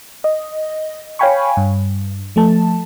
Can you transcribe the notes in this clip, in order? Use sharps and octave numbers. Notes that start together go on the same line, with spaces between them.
D#5
C#5 F5 G5 G#5 B5 C#6
G2
F3 A3 A5